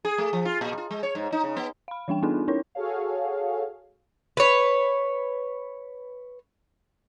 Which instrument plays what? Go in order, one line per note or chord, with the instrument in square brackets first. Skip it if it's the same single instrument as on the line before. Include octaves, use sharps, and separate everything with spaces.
[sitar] G#4
A3
F3
F4
A#2
F4
G#3
C#5
G#2
D#4
C#3
B3
[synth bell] F5 B5
E3 G3 D4 G5
B3 D4 D#4 F4 G#4 A4
C#4 D#4 E4 A#4 C#5
[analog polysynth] F#4 G#4 A4 C#5 F5
[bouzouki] B4 C#5